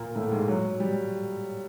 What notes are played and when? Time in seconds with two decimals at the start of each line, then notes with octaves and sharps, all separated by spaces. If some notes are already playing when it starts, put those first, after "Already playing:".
Already playing: A#2 A#3
0.16 A2 A3
0.32 G#2 G#3
0.48 F#3
0.80 G3